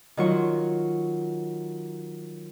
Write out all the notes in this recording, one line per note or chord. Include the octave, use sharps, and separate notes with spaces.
D#3 F#3 F4 C#6